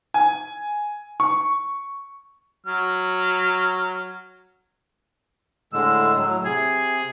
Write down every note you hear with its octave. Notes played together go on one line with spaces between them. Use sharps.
G#5
C#6
F#3 F6
A2 D3 G#3 E6
A2 F#3
C3 G#4